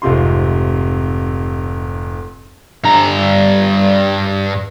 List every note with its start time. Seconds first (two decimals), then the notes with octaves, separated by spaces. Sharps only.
0.02 F1 G#2 C3 F4 C6
2.85 G2 A#5